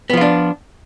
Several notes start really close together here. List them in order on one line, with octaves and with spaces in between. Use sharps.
B3 F3 F4 D4